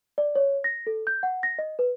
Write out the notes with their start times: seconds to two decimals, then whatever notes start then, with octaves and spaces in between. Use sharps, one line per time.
0.18 D5
0.36 C#5
0.64 A#6
0.87 A4
1.07 G6
1.23 F#5
1.43 A#6
1.59 D#5
1.79 B4